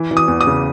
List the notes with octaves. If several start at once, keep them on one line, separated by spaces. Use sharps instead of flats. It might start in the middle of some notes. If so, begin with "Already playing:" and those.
Already playing: E3
E3
D#6
E2
D#6
C#3